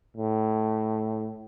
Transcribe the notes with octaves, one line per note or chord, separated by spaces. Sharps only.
A2